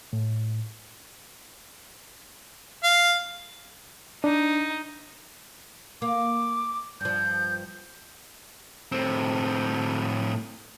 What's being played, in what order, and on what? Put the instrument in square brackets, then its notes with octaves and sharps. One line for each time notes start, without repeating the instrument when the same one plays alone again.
[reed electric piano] A2
[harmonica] F5
[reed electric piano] D4 [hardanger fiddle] D#4
[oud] A#3 [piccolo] D6
[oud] G2 F3 [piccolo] G6
[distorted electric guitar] A2 C4